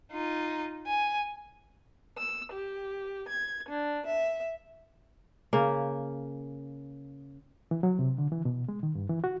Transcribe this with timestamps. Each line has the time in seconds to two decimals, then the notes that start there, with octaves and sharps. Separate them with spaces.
0.12 D#4 F4
0.87 G#5
2.17 E6
2.52 G4
3.28 G#6
3.69 D4
4.06 E5
5.53 C#3 A#3
7.71 E3
7.83 F#3
7.99 C3
8.18 D3
8.32 E3
8.45 B2
8.69 G#3
8.83 D#3
8.95 G2
9.10 E3
9.24 F#4